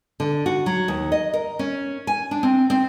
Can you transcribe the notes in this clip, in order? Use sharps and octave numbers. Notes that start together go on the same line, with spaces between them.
D3
F#4
F#3
D#2
D#5
A#4
C#4
G#5
D4
C4
C4